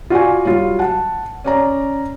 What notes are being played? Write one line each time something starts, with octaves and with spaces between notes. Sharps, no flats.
F4 F#4 D5 G#5
F#3 G3 F4
F#5 A5
C#4 D5 A#5